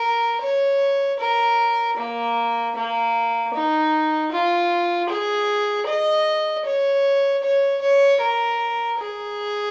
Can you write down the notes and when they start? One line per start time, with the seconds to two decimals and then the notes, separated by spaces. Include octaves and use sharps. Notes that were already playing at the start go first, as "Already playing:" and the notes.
Already playing: A#4
0.42 C#5
1.19 A#4
1.97 A#3
2.76 A#3
3.53 D#4
4.32 F4
5.09 G#4
5.87 D#5
6.65 C#5
7.43 C#5
7.81 C#5
8.20 A#4
8.99 G#4